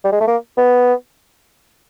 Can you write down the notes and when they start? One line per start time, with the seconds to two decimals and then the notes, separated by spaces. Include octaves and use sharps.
0.05 G3
0.12 G#3
0.21 A3
0.28 A#3
0.58 B3